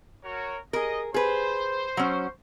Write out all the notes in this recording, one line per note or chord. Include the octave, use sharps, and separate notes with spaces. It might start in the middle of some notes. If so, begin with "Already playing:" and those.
F#4 A#4 C#5
G#4 A#4 D#5
G#4 B4 C5
F#3 C#4